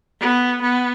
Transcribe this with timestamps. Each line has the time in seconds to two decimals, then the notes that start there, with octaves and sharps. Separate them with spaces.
0.21 B3
0.62 B3